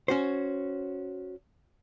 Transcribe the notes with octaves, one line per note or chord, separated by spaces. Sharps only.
C#4 F#4 C5